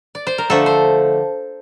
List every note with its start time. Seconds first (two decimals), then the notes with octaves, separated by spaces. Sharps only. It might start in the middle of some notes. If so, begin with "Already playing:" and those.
0.15 D5
0.27 C5
0.38 A#4
0.50 D3 F3 A3 A4
0.66 C5